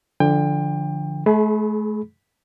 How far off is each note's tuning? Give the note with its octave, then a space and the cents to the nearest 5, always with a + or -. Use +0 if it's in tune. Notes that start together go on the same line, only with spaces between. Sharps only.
D3 +0 F3 -20 G5 +25
A3 -40 G#4 +25 B5 +0